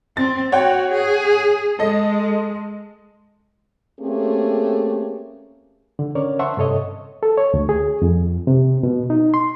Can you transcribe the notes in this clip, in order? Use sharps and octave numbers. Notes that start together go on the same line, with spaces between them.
C4 A6
F#4 C#5 F#5 G5
G#4
G#3 A4 D#5
A3 A#3 C4 C#4 G4 G#4
D3
D3 C#4 A#4 C#5 D5
C5 E5 F#5 A5 C6 C#6
G2 C3 A4 C#5 D#5
A4
C#5
D2
G#4
F2
C3
B2
D#4
C6